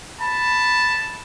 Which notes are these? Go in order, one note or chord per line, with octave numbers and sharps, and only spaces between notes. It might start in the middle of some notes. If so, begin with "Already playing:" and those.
A5 B5